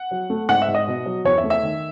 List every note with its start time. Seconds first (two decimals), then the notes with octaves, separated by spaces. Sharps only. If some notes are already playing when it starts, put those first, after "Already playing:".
Already playing: F#5
0.11 F#3
0.30 A3
0.49 G#2 F#5
0.62 E5
0.68 G#2
0.74 D#5
0.87 B2
1.06 F#3
1.24 E2 C#5
1.38 E5
1.43 A3
1.50 E5
1.63 D#3